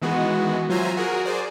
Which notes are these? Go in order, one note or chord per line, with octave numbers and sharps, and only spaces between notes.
D#3 E3 G#3 B3 F#4
F#3 F4 C5 E5 G#5 A#5
F#4 G#4 A#4
G#4 C5 D5